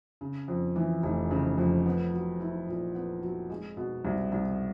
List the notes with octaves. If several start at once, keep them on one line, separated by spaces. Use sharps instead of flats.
C#3
F2
E3
F1
C#3
F2
B3
F#3
E4
A#2
B3
F#3
G#3
B2
C2
C2